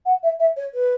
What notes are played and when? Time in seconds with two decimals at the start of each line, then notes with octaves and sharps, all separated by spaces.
0.06 F#5
0.23 E5
0.40 E5
0.56 C#5
0.74 B4